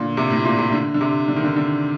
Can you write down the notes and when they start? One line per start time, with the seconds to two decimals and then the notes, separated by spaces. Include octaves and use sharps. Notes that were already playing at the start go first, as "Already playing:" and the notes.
Already playing: A#2 D3
0.17 C3
0.30 A2
0.45 A#2
0.58 C3
0.72 D3
0.94 D3
1.01 C3
1.28 D3
1.36 D#3
1.44 D3
1.57 D3